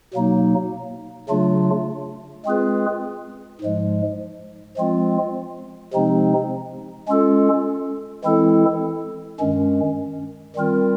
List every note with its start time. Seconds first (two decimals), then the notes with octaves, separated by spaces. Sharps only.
0.14 B2 F#3 A#3 D#4
1.29 C#3 F#3 A3 D4 F4
2.45 G#3 C4 F4 G#4 B4
3.61 G#2 F3 G#3
4.77 F3 G#3 C4 F4
5.93 C3 F3 G#3 C4 D#4
7.08 G#3 C#4 F4 A4
8.24 E3 G#3 C4 E4 A4
9.40 G2 D#3 G#3 C#4
10.56 D#3 G3 C4 F4 A#4